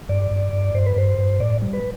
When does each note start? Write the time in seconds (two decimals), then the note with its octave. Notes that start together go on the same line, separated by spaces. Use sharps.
0.09 G2 D5
0.31 G2
0.53 G2
0.74 G2 C5
0.86 B4
0.96 G2 C5
1.18 G2
1.40 A2 D5
1.62 G3
1.73 B4